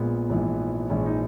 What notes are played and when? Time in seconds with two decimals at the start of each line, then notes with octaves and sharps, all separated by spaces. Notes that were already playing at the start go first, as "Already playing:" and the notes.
Already playing: A#1 A#2 G#3 B3
0.30 A#1 G#2 E3
0.90 A#1 G#2 E3 G#3 C#4
1.06 D#4